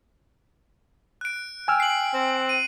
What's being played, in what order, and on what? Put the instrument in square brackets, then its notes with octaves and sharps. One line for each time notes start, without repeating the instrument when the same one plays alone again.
[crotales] F#6 D7
[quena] G5 [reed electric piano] G#5 E6 F6
[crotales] C7 F#7
[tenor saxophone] C4
[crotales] D#7